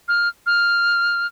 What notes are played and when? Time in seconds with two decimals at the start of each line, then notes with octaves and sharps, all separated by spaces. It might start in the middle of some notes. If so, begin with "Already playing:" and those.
0.08 F6
0.46 F6